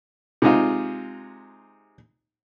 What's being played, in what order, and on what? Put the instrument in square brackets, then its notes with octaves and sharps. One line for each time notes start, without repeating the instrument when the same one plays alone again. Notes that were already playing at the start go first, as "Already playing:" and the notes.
[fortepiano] C3 G#3 D#4 F4